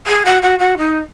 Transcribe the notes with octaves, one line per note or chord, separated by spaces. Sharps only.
G#4
F#4
F#4
F#4
D#4